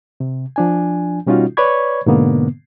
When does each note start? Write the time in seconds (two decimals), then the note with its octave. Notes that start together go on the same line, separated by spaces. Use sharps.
0.20 C3
0.56 F3 D4 G#5
1.26 B2 G3 C#4 D#4 F4 F#4
1.57 B4 C#5 D5 B5 C#6 G#6
2.06 G#2 B2 D3 A#3 B3